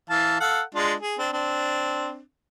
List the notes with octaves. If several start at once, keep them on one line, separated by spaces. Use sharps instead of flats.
E3 F5 A5
A4 F5 F#5
G#3 D4 F4
G#4
C4 D4
C4 D4